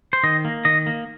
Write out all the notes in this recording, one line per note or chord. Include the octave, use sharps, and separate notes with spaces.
C5
D#3 D#5
A#3
D#3 D#5
A#3